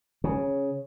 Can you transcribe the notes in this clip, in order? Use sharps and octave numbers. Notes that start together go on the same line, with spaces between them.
C#3